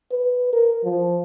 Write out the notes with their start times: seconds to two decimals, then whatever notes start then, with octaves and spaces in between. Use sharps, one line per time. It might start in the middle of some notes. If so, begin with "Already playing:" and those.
0.12 B4
0.53 A#4
0.84 F3